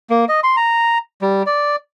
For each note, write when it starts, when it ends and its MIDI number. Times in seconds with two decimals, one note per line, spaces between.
0.10 0.25 58
0.29 0.40 75
0.43 0.56 84
0.57 0.98 82
1.22 1.43 55
1.46 1.76 74